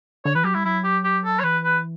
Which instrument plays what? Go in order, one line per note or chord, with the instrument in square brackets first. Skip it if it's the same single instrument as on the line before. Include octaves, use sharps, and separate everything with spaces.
[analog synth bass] D3 [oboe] C#5
[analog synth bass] E3 [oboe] B4
[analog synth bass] F#3 [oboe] G4
[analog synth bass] G3 [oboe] E4
[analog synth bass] F#3 [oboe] E4
[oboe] G4
G4
A4
C#5
[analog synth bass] E3 [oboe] B4
[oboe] B4